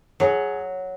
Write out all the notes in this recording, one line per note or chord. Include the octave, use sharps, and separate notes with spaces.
F#3 G#4